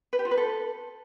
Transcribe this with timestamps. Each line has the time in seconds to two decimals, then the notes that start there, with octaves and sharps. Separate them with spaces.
0.13 B4
0.19 G4
0.25 F4
0.31 B4
0.37 A4